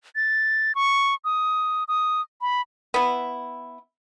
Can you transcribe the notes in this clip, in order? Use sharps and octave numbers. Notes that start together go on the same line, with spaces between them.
A6
C#6
D#6
D#6
B5
B3 E4